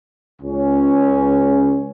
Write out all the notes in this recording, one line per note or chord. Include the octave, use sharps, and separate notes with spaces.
C#2 C#4